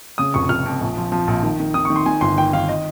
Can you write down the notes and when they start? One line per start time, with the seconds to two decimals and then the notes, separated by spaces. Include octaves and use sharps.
0.18 C#3 D#6
0.34 F1 C#6
0.49 F1 F6
0.66 F2
0.81 A#1
0.97 F3
1.12 F3
1.27 A#1
1.43 D#3
1.60 D#3
1.74 D#3 D#6
1.85 C#6
1.90 D#3
1.96 C6
2.06 D#3 G#5
2.21 G1 C6
2.38 D#3 G5
2.53 D#3 F5
2.69 D#5